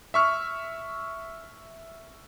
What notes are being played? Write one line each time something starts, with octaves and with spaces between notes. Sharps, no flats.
E5 C#6 F6